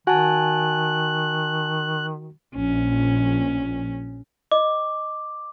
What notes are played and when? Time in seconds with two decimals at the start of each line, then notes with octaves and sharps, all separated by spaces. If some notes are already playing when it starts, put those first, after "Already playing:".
0.07 D#3 F#4 G#5 A5 F#6
2.55 A#1 C#4
4.51 D#5 D6